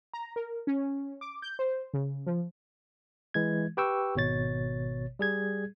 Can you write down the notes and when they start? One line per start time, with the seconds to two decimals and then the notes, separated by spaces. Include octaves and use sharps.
0.13 A#5
0.36 A#4
0.67 C#4
1.21 D6
1.42 G6
1.59 C5
1.93 C#3
2.27 F3
3.34 E3 G#3 G#6
3.77 G4 B4 G5 C#6 E6
4.15 G#1 B2 C#5 A6
5.19 G3 G#4 G#6